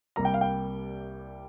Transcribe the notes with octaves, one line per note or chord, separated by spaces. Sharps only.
C2 C3 G3 A#3 A#5
G5
F5
G5